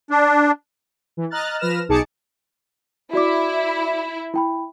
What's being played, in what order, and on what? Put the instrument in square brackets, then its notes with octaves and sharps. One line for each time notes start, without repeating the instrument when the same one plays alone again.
[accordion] D4
[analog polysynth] E3
D#5 A#5 F6 F#6 A6
F3 B4 F6 A#6 E7
B1 D#4 G#4 A5 D6 C#7
[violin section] E4 [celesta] F#4 D5 D6
[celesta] E4 G5 B5